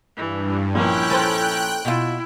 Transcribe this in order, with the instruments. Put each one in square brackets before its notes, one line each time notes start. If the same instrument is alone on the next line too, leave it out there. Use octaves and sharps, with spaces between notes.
[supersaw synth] G2 [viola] E3
[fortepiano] A#1 A#3 [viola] C#4 E4 [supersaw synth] G5 F#6
[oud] A4 B4 C5
[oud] B2 F4 [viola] E4